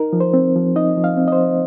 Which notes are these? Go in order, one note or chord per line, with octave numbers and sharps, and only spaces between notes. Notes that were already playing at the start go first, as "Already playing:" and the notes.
Already playing: D#4 A#4
F3
C5
C4
F3
D#4 D#5
F3
F5
C4
D#5
C5
F3